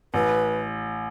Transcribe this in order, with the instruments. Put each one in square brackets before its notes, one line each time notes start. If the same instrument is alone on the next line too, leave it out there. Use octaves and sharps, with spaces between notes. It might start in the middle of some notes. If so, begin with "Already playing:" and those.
[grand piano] A1 [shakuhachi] B4